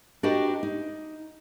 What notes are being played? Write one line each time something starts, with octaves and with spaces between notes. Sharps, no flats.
D4 F#4 G4 A#4 B4 D#5
D#4